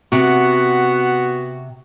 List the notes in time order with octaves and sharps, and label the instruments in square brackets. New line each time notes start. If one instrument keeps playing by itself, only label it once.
[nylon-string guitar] C3 [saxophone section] B3 F#4